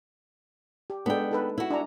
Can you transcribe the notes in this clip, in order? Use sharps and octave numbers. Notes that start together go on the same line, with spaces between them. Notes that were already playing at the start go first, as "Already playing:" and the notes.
G4
G#3 B3 D4 A4 G5
D#4 A4 B4
E4 F#4
D4 G#5 A#5